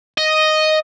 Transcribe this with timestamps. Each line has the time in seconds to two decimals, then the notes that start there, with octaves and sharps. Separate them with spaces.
0.18 D#5